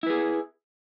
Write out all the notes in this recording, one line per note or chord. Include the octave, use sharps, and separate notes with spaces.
E4 G#4 B4